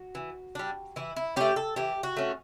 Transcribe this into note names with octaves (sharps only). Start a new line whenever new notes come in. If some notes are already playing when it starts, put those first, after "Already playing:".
Already playing: F#4
E3
G3 D4
E3 E4
E4
A3 C#4 G4
A4
E3 G4
F#4
A3 C#4